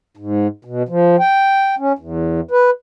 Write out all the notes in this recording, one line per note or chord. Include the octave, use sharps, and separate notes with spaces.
G#2
B2
F3
G5
C#4
E2
B4